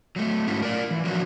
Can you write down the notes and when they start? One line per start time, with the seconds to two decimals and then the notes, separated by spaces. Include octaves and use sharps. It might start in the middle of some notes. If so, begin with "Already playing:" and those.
0.16 F#3 A3
0.47 G#2 C#4 E4 F#4
0.62 A#4 D5
0.91 E3
1.04 F3 F#3 D4 E4 F#4